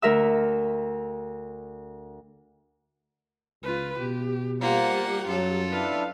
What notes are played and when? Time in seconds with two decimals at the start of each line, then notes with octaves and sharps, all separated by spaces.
0.02 D2 A#4 E5 E6
3.63 C#2 F4 B4
3.99 B2 G4
4.61 G3 A#3 F4 G4 C5 F#5
5.26 F#2 F#3 F4 A4
5.71 D4 E4 B4 F5